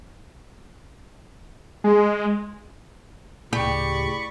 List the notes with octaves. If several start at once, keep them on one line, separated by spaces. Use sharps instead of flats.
G#3
D2 A2 C#3 G4 D5 B5 C#6